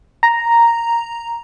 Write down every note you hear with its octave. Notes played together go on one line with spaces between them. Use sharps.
A#5